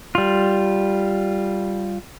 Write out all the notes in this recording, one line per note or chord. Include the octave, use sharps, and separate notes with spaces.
G3 F4